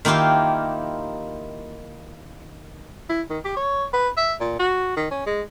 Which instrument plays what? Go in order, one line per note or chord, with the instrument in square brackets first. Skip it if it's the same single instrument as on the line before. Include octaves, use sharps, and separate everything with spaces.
[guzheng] D#3 A#3 E4 F4 G4 F5
[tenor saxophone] E4
D#3
G4
C#5
B4
E5
A#2
F#4
D#3
C#4
G#3